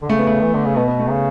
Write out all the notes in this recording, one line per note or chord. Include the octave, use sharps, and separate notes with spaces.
D3
C#3 A3
B3
A3
E3
D3
C#3
B2 B3
B3
A3
C#3